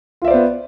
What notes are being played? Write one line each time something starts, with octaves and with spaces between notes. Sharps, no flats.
B3 F4 C5 D5 E5